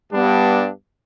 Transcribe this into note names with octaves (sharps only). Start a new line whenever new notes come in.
G2 G3 B3 D4